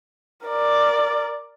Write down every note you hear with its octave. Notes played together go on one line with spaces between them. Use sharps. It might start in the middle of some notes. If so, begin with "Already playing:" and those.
A#4 D5